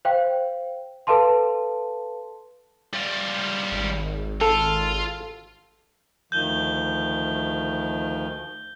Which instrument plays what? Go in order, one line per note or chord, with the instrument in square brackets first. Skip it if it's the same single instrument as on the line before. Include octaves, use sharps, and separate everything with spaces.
[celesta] C5 F5 G5
A4 B4 F5 A5 C6
[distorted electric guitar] G3 F4
[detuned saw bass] G#1
[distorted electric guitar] F4 [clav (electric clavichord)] A4
[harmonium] D2 D#3 F3 [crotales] G6 G7